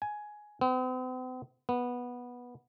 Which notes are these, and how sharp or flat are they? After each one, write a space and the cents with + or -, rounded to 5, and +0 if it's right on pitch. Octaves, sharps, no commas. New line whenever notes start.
G#5 +10
C4 -45
B3 -10